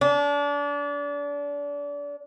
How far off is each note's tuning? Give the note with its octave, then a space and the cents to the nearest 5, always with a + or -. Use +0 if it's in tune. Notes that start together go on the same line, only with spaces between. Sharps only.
D4 -30